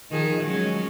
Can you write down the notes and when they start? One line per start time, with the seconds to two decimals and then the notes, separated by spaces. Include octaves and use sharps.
0.11 D#3 F3 G#4
0.42 F#3 G#3 C#4